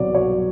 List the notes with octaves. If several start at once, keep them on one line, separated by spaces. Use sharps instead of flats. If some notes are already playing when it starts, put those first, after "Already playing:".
Already playing: C2 B2 F#3 D5
F#3 C#5